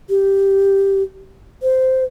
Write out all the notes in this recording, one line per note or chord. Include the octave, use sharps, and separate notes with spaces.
G4
C5